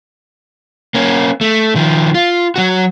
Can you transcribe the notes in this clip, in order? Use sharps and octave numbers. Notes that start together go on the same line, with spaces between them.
A#3 C#4
A3
D#3 F3
F4
F#3 F#4